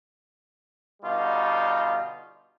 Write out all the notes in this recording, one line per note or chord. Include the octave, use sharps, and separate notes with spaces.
B2 D3 G3 D#4 F4